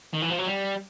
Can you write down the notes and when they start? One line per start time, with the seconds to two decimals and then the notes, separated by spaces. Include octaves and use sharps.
0.14 D#3
0.22 E3
0.30 F3
0.39 F#3
0.48 G3